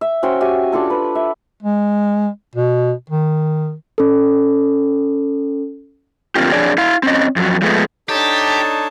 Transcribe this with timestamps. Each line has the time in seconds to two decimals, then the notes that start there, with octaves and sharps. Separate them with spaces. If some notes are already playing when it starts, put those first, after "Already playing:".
0.01 E5
0.23 C#4 F#4 C5 G5
0.40 F#4 G4 E5 G#5
0.72 D4 F4 A4 A5
0.90 B4
1.15 E5
1.63 G#3
2.55 B2
3.10 D#3
3.98 C#4 A4
6.35 D3 A#3 C4 F4 G4
6.52 F2 D4 G#4 C#5 D5
6.78 E4 F5
7.03 C4 C#4 D#5
7.36 F2 F#3
7.62 F3 G#3 A3 B3
8.09 D4 D#4 G4 A4 C#5 A5